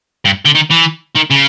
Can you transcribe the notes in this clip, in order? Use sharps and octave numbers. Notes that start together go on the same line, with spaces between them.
G2
D3
D#3
E3
D#3
C#3